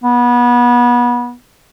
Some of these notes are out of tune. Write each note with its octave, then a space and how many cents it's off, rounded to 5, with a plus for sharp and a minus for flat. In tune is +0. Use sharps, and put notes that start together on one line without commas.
B3 -25